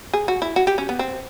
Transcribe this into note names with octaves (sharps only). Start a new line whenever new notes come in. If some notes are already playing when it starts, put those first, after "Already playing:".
G#4
F#4
E4
F#4
G4
C#4
B3
C4